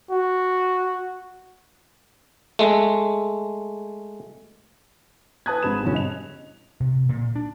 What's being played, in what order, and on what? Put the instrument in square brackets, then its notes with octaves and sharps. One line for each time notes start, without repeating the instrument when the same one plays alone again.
[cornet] F#4
[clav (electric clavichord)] G#3 A3
[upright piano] B4 G#5 A5 D#6 F#6 G#6
G#1 G#2 G#3 B5 D#6 E7
E2 G2 B2 D3 C#4
D#5 F7
[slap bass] C3
A#2
D4